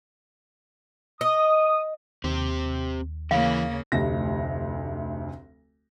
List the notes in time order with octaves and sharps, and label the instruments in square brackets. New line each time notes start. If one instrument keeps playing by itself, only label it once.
[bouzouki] D#5 [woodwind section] D#6
[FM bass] D#2 [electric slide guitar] C4 G4 C5
[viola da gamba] C#3 A#3 [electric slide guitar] E3 E4 [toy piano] F5
[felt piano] F1 D2 G4 A#6